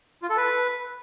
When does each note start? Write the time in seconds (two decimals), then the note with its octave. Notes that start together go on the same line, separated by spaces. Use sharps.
0.22 F4
0.30 A4
0.37 B4